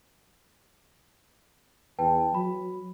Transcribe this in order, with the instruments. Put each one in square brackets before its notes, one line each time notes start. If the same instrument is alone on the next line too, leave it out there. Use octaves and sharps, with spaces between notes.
[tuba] E2 [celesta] B4 G5 A5
[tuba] F#3 [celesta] B5